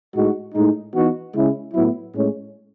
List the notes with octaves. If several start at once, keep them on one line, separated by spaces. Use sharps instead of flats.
A2 G#3 D#4 F#4
A2 G#3 D#4
E3 B3 D#4 F#4
C#3 G#3 C#4 E4
A2 F#3 B3 E4
A2 G#3 C#4